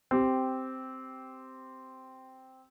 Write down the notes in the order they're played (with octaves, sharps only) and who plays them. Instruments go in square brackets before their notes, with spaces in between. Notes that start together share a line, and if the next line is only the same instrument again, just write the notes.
[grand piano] C4 G4